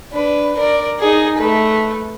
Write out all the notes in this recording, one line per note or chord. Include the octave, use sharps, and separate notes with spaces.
D4 B4
A#4 D5
D#4 G#4
A3 B4